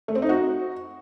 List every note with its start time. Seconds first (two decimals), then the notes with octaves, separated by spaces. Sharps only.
0.08 A3
0.15 C4
0.22 D#4
0.29 F#4